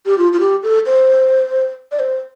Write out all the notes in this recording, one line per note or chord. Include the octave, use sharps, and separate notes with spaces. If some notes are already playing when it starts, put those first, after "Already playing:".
G4
F4
F4
G4
A4
C5
D5
C5